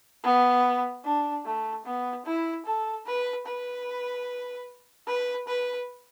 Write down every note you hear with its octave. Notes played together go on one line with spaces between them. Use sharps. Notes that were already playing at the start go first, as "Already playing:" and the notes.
B3
D4
A3
B3
E4
A4
B4
B4
B4
B4